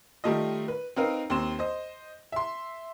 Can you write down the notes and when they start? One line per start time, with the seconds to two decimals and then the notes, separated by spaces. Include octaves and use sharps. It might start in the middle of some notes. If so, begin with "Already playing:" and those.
0.24 D#3 G3 A3 D#4 F4 D#5
0.68 B4
0.96 C4 D#4 A#4 B4 F5
1.30 D#2 C4 C6 E7
1.59 C5 D#5
2.32 E5 C6